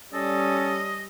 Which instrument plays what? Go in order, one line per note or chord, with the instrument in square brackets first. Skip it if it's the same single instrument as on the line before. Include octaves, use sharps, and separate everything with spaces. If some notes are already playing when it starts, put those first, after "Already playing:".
[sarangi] G3 [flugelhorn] C#4 [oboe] A4 [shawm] D#5